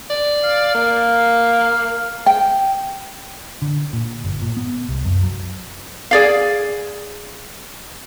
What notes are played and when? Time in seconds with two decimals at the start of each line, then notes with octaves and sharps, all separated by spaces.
0.10 D5
0.44 F5
0.74 A#3
2.26 G5
3.62 D3
3.93 A#2
4.25 G1
4.42 A#2
4.57 B3
4.89 C2
5.05 F#2
5.23 F#3
6.11 G#4 D5 F5